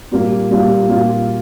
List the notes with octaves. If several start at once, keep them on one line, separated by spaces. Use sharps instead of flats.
A#2 G3 A#3 F4
A#2 G3 A#3 F4
A#2 G3 A#3 F4